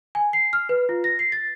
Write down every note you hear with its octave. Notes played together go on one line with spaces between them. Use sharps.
G#5
C7
F6
B4
F4
A#6
C7
A6